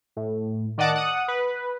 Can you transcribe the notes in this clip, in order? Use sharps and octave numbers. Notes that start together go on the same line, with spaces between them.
A2
D#3 D5 D#5 F#5 A5 D6
F#5 D#6
B4